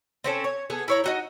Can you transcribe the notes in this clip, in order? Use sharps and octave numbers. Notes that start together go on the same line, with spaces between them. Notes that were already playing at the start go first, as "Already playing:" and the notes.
C4 C#4 A4
C#5
B3 G#4 A4
E4 C#5 A#5
D#4 F#4 D#5